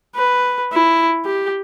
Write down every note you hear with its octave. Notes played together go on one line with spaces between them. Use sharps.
B4
E4
G4